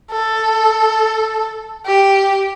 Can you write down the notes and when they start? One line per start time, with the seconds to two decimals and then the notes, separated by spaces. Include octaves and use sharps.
0.11 A4
1.86 G4